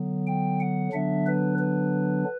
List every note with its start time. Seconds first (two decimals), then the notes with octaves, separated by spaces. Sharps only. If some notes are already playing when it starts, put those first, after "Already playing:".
Already playing: D3 F#3 B3
0.27 G5
0.60 F#5
0.93 D3 F#3 B3 D4 E5
1.26 B4
1.58 B4